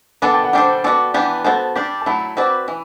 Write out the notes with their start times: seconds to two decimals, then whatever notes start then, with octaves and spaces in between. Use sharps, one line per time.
0.22 B3 D4 A4 D5 A5
0.33 G5
0.44 F#5
0.53 G3 D4 A4 C5 G5
0.84 B3 F#4 A4 D5
1.14 E3 B3 D4 G4 B4
1.44 B3 F#4 A4 C5 A5
1.76 G3 D4 G4
2.01 A5
2.06 F#3 A3 E4 B5
2.37 C4 F#4 B4 D5
2.68 E3